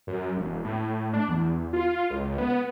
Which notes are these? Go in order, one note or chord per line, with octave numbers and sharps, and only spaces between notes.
F#2
E1
A2
D4
E2
F4
C#2
B3